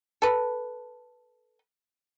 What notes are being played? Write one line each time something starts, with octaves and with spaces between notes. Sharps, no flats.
A4 B4